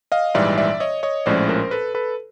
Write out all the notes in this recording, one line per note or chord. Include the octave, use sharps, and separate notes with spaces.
D#5 F5
A#1 G#2 E3 G3 D5 E5
D5 E5
C#5 D#5
C#5 D#5
A#1 A2 F3 G#3 C#4 C5 D5
A#4 C5
A4 B4
A4 B4